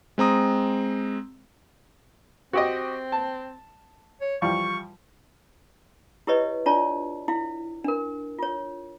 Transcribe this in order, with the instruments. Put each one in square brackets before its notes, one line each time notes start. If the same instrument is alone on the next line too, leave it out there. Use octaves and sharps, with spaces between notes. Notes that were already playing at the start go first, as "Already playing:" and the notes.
[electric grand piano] G#3 C4 A#5 D#6
[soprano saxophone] C4 [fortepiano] F#4 G4 D#5
[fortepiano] A5
[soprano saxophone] C#5
[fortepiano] E3 F3 G3 [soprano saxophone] C#6
[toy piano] E4 G4 B4 C#5 D#5
D4 F4 C#5 D5 A5
E4 F5
D4 A#4
F4 C#5